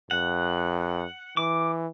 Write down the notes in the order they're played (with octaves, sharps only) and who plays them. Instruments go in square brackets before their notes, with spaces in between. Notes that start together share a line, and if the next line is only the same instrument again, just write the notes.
[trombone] F2 [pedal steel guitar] F#5
[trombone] E3 [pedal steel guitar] D6